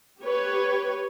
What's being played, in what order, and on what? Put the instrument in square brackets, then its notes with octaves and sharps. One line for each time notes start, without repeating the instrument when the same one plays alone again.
[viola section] G4 B4 C#5